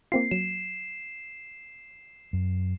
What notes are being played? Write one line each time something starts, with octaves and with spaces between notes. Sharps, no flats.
A#3 C4 F4 C7
F#3 E7
F#2